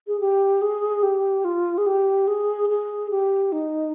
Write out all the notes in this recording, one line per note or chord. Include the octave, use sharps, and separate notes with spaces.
G#4
G4
G#4
G4
F4
G#4
G4
G#4
G#4
G4
D#4